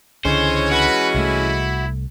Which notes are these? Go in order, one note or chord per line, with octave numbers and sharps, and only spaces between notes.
C#2 D3 E3 G#3 C#4 C5 C#5
F#4 B4
C2 A3 E4